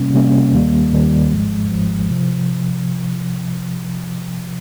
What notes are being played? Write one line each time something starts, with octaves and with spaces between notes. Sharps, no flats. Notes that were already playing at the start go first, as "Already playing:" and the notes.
Already playing: C3 G3 A#3 C#4
C3 G3 A#3 C#4
D#2 D#3 G3 A#3
D#2 D#3 G3 A#3
G#1 G#2 F3 G#3
G#1 G#2 F3 G#3
C3 F3